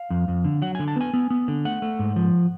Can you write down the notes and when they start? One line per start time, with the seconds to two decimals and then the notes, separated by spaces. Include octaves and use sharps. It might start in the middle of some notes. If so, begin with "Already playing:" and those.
Already playing: F5
0.10 F2
0.28 F2
0.44 D3
0.62 F#3 F#5
0.75 D3 G#5
0.88 A5
0.96 B3 G#5
1.13 B3
1.30 B3
1.48 D3
1.65 A3 F#5
1.82 A3
1.99 G#2
2.16 F3